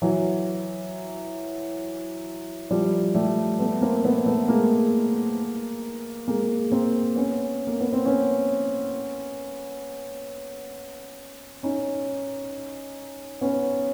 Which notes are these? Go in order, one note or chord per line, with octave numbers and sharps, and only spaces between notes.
E3 F#3
F3 G3
G3 A3
A3 B3
A#3 C4
A3 B3
A3 B3
G#3 A#3
G#3 A#3
A#3 C4
B3 C#4
A#3
B3
C4
B3 C#4
C#4 D#4
B3 C#4